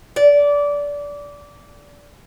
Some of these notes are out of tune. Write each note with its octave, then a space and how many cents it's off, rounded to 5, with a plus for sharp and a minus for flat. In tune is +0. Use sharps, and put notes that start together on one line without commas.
D5 -20